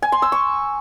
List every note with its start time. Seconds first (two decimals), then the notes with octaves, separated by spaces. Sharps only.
0.02 G#5
0.12 C6
0.22 E6
0.32 C#6